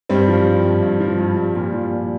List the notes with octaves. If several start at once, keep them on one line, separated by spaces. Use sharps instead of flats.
G2 G3 C4
F3
F3
G2
G2
F3
G2
G2
A#2 G3
F3
A#2